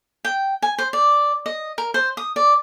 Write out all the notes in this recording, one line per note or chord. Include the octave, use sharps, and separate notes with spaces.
G5
G#5
C5
D5
D#5
A#4
C5
D#6
D5